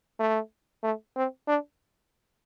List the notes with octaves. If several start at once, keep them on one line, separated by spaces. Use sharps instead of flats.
A3
A3
C4
D4